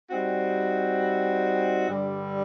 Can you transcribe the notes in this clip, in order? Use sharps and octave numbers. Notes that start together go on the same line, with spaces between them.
G3 C4 D#4 F#4
G2 D3 G3